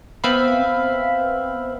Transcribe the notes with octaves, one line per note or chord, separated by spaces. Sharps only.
B3 C4 E5 F5 B5